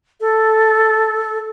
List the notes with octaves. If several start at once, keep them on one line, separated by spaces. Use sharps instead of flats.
A4